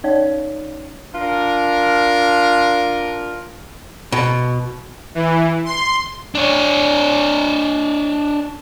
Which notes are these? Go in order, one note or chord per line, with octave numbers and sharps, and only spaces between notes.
C#4 D#4 C#5 D5 F5
D4 F4 A#4
B2
E3
C6
D4 C#5